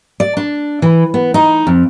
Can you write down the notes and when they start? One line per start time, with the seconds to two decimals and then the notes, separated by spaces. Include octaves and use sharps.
0.20 D5
0.37 D4
0.82 E3
1.14 B3
1.34 D#4
1.67 F2